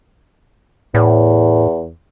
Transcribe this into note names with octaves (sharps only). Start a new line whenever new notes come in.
E2 A2